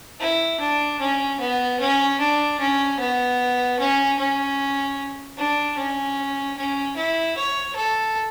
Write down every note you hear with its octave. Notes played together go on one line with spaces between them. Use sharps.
E4
D4
C#4
B3
C#4
D4
C#4
B3
C#4
C#4
D4
C#4
C#4
E4
C#5
A4